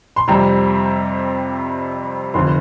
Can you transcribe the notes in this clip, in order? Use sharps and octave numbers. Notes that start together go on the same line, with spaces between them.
C6
F2 C3 G3 C4 A#5
F1 F2 D3 C6